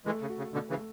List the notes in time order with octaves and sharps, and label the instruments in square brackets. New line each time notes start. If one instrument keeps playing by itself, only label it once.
[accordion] E3 G#3 [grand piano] A3
[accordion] C#3
[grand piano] F#4
[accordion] C#3
[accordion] B2 D3 [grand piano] A3
[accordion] C#3 E3
[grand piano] A3